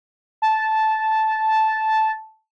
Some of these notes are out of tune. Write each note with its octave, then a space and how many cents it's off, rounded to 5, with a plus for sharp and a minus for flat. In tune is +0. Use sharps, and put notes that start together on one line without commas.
A5 -10